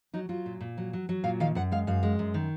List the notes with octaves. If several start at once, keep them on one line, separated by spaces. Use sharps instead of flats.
F#3 D#4
F#3 F4
A#2
A#2
F#3
F#3
F#3
A#2 F5
D#3 F5
F#2 F#5
G#3 F5
F#2 F5
G#3
F#2
D#3